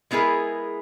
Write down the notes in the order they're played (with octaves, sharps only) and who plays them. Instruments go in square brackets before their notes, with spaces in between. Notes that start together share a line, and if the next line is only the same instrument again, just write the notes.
[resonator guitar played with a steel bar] G#3 B3 E4 G#4 A#4